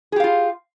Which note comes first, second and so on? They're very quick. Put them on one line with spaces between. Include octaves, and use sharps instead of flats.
G#4 G4 F5 F4